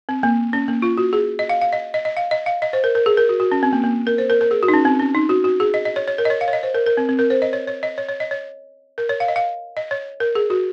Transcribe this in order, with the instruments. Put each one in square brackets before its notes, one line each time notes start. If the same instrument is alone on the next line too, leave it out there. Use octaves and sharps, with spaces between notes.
[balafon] C4
A#3
C#4
A#3
F4
F#4
G#4
D#5
F5
F5
D#5
D#5
D#5
F5
D#5
F5
D#5
C5
A#4
A#4
G#4
A#4
F#4
F#4
C#4
C4
A#3
A#3
A#4
C5
A#4
A#4
G#4
F#4
D#4
C#4
C4
C#4
D#4
F#4
F#4
G#4
D#5
D#5
C#5
C#5
A#4
D#5
C#5
F5
C#5
D#5
C5
A#4
A#4
C4
C4
A#4
C5
D#5
C#5
C#5
D#5
C#5
C#5
D#5
C#5
A#4
C#5
F5
D#5
F5
D#5
C#5
A#4
G#4
F#4